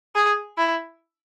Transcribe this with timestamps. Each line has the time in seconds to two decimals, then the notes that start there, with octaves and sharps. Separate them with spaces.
0.15 G#4
0.58 E4